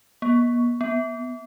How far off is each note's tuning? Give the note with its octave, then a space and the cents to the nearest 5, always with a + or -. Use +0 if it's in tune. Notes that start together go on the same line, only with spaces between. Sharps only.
B3 -45
B3 +15